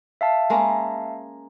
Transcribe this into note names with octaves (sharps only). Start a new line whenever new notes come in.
E5 F5 A5
G#3 A#3 C#4